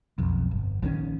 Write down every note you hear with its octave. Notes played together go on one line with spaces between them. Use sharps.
B1 F2
G1
A#1 D#3 F3 C#4